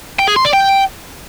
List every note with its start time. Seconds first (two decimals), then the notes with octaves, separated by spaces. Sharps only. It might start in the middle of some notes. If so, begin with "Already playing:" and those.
0.19 G5
0.28 G#4
0.36 C6
0.45 D5
0.53 G5